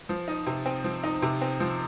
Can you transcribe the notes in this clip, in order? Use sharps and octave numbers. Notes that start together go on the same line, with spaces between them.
F3
D#4
C3
C4
F3
D#4
C3
C4
F3